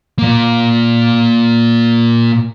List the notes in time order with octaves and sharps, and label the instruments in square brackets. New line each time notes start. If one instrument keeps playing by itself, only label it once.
[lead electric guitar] A#2 A#3